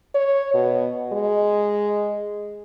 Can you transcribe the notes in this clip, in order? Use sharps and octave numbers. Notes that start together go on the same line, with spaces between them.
C#5
B2
G#3